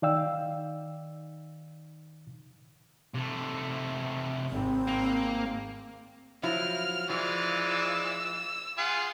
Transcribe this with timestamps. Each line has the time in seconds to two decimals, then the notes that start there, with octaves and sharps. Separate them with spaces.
0.02 D#3 D#4 D5 F5 G5 E6
3.15 C3 A3
4.49 G#1 C4
4.88 A#3
6.43 F3 F#3 E4 F6
7.10 E3 F3 G#3 D5 F6
7.68 E6
8.78 F4 G#4 F5 F#5